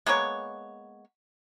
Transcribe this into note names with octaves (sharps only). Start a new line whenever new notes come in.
G#3 A#3 B3 C#5